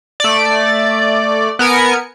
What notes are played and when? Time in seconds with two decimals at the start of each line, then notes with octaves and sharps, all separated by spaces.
0.20 A3 D5
1.59 B3 A#4 G#5 C#7